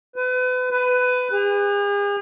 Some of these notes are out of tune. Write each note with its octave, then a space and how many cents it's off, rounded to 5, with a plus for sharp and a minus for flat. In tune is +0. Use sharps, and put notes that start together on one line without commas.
B4 +35
B4 +20
G#4 -40